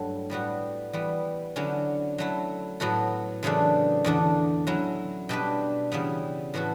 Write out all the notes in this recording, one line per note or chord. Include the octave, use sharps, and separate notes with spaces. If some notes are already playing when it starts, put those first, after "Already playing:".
Already playing: G2 F#3 A3 E4 A4
A2 G3 B3 F#4
E3 G3 B3
D3 F#3 C#4 E4
F#3 A3 E4
A2 F#3 B3 F#4 A4
F#2 C#3 E3 A3 D4
E2 D3 A3 D4
F#3 C#4 E4
B2 G3 D4 G4 B4
C#3 E3 G3 B3
A2 E3 B3 F#4 A4